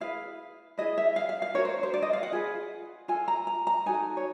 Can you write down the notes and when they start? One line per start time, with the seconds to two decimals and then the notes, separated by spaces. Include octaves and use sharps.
0.01 E4 G#4 B4 F5
0.78 E4 G#4 B4 D#5
0.98 E5
1.16 F5
1.29 F5
1.42 F5
1.54 D4 F#4 A#4 C#5
1.65 C5
1.83 C5
1.94 D5
2.02 D#5
2.13 F5
2.23 F#5
2.32 F4 G#4 B4
3.08 F4 A4 G#5
3.28 A#5
3.47 A#5
3.67 A#5
3.86 D#4 F#4 A4 G#5
4.17 C#5